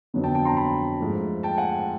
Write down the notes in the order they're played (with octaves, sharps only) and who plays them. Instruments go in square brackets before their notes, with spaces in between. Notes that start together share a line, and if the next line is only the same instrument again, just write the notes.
[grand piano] F2 D3 F#3 B3
G5 A5
G5 A5
A#5 C6
A5 B5
G#2 F3 A3
G5 A5
F#5 G#5